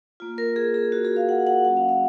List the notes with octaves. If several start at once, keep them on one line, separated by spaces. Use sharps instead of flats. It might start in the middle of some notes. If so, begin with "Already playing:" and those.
A#3 F4
A#4
G#4
G#4
F#4
G#4
F5
F#5
F5
F#5
F#3 A#3 C#4 F#4 F#5
F5
F5